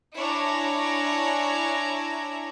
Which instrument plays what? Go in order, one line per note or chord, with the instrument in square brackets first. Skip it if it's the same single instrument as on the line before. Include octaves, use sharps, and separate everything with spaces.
[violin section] D4 E4 C#5 G#5 A#5